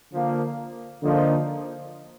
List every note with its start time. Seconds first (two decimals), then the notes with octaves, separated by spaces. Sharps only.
0.11 D3 F3 A#3
1.02 D3 F3 A#3 D#4